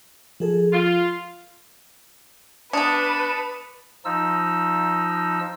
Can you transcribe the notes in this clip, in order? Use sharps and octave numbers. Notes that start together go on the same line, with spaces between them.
F3 G#4 A4
F4
B3 D4 B4 A5 D#6 C#7
F3 D#4 E6